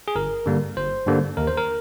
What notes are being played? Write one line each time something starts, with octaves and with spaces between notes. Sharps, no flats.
G#4
G1 A#4
G2 D3 G3 A#3
G1 C5
G2 D3 G3 A#3
D#2 A#4
C5
A#4